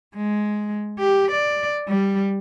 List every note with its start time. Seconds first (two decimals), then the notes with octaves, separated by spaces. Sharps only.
0.16 G#3
0.99 G4
1.32 D5
1.88 G3